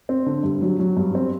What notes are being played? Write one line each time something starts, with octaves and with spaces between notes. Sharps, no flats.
C4
D3
G2
F#3
F#3
G2
C4